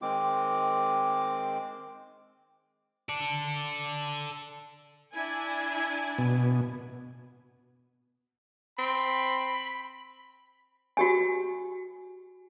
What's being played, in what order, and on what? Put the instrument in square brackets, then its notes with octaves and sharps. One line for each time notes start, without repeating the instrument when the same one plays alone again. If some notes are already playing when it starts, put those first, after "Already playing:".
[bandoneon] D#3 G#3 C4 D6
[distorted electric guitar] A4 D5
[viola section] D4 E4 G#5
[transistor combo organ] B2
[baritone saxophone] C4 [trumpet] B5
[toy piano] F#4 G4 G#5